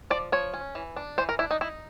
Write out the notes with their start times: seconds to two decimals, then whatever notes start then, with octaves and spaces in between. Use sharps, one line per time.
0.10 F3 D5
0.32 F3 C#5
0.54 C#4
0.75 E3
0.97 D4
1.18 E3 C5
1.29 A#4
1.39 D4 E4
1.51 D#4
1.61 D#4 E4